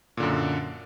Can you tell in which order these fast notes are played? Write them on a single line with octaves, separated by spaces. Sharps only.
A#2 D3 F#2